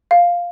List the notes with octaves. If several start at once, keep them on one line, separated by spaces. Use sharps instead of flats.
F5